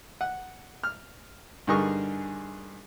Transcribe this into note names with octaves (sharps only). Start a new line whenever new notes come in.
F#5
F6
G2 D3 D#4 G#4 A#4 C#6